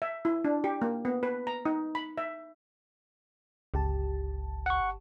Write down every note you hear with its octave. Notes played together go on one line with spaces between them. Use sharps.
E5
E4
D4
G4
A#3
B3
B4
A#5
D#4
B5
E5
G1 C#2 G4 A5
F#5 C#6